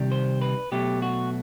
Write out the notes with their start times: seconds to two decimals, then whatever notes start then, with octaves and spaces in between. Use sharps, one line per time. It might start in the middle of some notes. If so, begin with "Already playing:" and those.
Already playing: C3 D#3 G3
0.12 C5
0.42 B4
0.72 B2 F#3 A3 G4
1.02 F#4